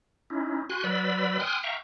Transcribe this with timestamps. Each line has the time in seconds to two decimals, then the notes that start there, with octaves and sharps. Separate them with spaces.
0.30 C#4 D#4 E4
0.70 F#4 G#5 C6 F#6
0.84 F#3 B4 D5 B5 E6
1.40 G5 G#5 C6 D#6 F6 F#6
1.63 E5 F5 G5 A#5 C#6